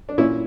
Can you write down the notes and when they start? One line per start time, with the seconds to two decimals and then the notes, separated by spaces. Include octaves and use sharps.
0.09 D4
0.18 A#2 C#4 E4